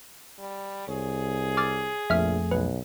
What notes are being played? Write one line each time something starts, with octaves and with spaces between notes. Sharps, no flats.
G3
C2 G#4 C#5
D6 F6 A6
A#1 F2 F3 A3 E5 F6
B1 B4